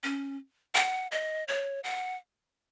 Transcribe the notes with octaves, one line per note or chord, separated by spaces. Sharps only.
C#4
F#5
D#5
C#5
F#5